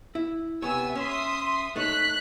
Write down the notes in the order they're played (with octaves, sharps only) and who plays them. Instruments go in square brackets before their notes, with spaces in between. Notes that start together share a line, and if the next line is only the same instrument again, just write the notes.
[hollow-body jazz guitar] E4
[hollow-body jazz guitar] C3 B3 C#5 [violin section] G#5 E6
[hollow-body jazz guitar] C#4 C#5 [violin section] E5 C6 D#6
[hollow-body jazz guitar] A3 D#4 C#5 [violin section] F#6 B6